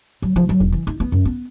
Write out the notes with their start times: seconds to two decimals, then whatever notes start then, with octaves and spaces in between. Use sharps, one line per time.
0.22 F#3
0.36 F3
0.49 F#3
0.60 E1
0.72 E3
0.87 D#4
1.00 B3
1.12 F#2
1.25 B3